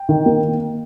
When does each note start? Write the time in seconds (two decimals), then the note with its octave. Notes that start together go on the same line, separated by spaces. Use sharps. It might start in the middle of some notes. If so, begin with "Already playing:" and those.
Already playing: G5
0.09 D#3
0.26 A#3